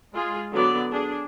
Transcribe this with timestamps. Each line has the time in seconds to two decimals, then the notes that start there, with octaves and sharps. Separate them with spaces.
0.13 G#3 F4 G#4
0.52 D3 F#3 B3 D5
0.92 D4 G#4